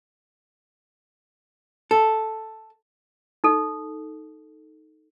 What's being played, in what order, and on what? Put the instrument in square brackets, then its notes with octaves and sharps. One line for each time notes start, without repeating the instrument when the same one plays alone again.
[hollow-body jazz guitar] A4
[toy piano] D#4 A4